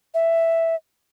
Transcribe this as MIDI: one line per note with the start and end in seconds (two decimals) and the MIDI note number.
0.14 0.75 76